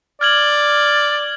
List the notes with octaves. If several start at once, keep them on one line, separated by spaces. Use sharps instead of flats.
D5 F6 G#6 F#7